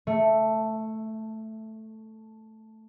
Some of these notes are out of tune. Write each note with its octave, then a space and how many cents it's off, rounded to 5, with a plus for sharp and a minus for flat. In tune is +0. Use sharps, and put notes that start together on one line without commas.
A3 +0